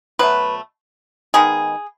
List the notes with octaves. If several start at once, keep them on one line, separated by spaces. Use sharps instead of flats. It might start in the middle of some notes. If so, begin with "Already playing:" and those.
B2 F#3 A3 B4
D#3 G#3 B3 G#4